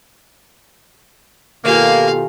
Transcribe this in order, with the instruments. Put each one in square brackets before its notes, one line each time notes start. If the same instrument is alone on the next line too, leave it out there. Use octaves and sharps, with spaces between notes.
[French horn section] B2 F4 A4 [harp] D#3 G4 G#5 [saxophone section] A#3 [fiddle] F5